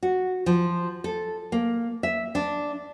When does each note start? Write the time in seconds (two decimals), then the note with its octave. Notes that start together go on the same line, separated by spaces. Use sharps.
0.03 F#4
0.46 F3
1.04 A4
1.52 A#3
2.03 E5
2.35 D4